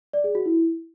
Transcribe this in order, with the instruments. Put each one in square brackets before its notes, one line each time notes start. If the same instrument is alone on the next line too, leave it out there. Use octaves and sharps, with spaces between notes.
[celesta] D5
G#4
F#4
E4